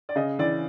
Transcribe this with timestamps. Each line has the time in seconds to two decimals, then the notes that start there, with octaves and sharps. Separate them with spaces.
0.09 D5
0.16 C#3 D#5
0.39 E3 D5